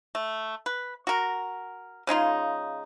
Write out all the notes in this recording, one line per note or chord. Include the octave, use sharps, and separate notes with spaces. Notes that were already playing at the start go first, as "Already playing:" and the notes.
A3
B4
F#4 A#4
C#3 G#3 D#4 F4